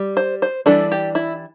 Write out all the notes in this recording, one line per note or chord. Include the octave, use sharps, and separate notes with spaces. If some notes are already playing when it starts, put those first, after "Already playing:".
Already playing: G3
C5
C5
E3 G3 D4 A4
G4
E4